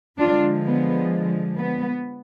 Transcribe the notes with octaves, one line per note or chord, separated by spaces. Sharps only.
D3 F3 G#3 D4 F4
B3
B3